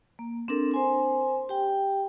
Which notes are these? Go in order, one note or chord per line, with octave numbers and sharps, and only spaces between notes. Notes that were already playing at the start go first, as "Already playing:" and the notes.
A#3
C4 D4 A4 A#4
C5 G#5 C6
G4 G5